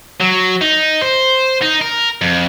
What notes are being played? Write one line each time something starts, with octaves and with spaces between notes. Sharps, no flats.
F#3
D#4
C5
D#4
A#4
F2